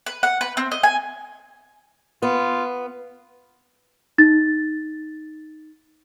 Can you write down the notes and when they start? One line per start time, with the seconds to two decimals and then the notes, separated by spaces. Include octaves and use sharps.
0.06 B4
0.23 F#5
0.41 B4
0.57 C4
0.72 D#5
0.83 G#5
2.22 B3 F4
4.18 D#4 A6